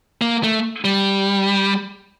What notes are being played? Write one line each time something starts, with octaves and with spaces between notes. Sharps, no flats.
A#3
A3
G3